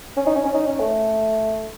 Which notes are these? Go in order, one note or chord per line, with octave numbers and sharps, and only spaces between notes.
C#4
D#4
C#4
C#4
D#4
C#4
A3